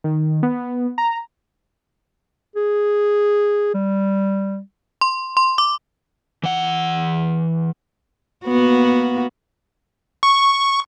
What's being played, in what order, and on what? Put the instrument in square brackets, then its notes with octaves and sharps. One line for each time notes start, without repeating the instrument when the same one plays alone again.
[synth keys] D#3
B3
A#5
[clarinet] G#4
G3
[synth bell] C6
C6
D6
[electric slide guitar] E3 F#5
[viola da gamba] A#3 B3 F#4
[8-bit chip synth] C#6